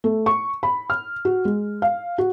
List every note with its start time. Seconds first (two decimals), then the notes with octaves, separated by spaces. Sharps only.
0.04 A3
0.26 C#6
0.63 B5
0.90 F6
1.25 F#4
1.45 G#3
1.82 F5
2.18 F#4